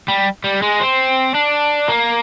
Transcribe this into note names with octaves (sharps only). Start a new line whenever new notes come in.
G3
G3
G#3
C4
D4
A#3